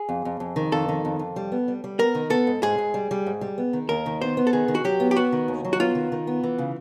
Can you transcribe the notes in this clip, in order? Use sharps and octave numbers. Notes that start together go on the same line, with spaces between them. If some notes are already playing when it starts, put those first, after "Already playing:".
Already playing: G#4
F2
F2
F2
D#3
F2 A4
D#3
F2
F2
G3
B3
G3
G3
B3 A#4
D#3
B3 A4
G#2
G#2 G#4
G#2
G3
G3
G#2
G3
B3
D#3
D#2 A#4
D#3
B3 C5
B3
A4
D#3 G#4
D#3
F#4
F#3 G4
B3
G4
B3 F#4
D#3
D#2
F#3
F#4
B3 F4
D#3
D#3
B3
E3
C#3